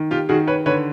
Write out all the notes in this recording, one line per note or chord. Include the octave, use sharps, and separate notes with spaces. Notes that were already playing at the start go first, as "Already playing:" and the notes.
Already playing: D#3
F4 G4
D#3 F#4 G#4
B4 C#5
D3 B4 C#5